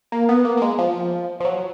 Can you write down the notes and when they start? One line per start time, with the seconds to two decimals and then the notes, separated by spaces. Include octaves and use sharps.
0.12 A#3
0.29 B3
0.45 A#3
0.57 A#3
0.62 G#3
0.79 F3
1.40 F3
1.45 F#3